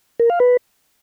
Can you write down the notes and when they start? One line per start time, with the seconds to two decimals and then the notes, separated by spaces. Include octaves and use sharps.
0.20 A#4
0.30 F5
0.40 B4